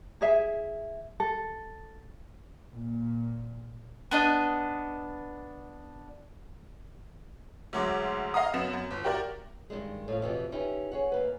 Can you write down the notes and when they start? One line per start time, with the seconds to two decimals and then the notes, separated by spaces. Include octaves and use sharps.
0.21 E4 G#4 E5
1.20 A4
2.73 A#2
4.11 B3 D4 D#5
7.73 D2 F#3 G#3 D6
8.34 D#5 F5 A#5 D#6
8.54 F#2 B3 E7
8.73 F#2
8.91 G1
9.03 F#4 G4 A#4 D5
9.70 G2 D#3 G3 G#3
10.08 A2 F3 F5
10.22 F2 B2 E3 G4
10.52 C#4 D#4 E4 G4 B4
10.92 G#4 C#5 F#5
11.12 E2 A#3 B4